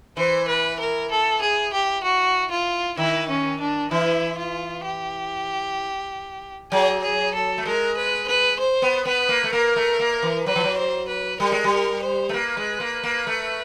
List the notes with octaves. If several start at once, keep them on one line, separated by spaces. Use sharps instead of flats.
E3 C5
B4
A#4
A4
G#4
G4
F#4
F4
D#3 E4
C#4
D4
E3 E4
F4
G4
F#3 G#4
G#4
A4
A3
G#3 A#4
B4
B4
C5
B3
B3 B4
A#3
A3
A#3 A#4
A3
A#3
E3
F#3 B4
F3
F#3
C5
B4
G3 A#4
G#3
G3
A#4
C5
A3
A#3 B4
G#3
A#3
A#3
A3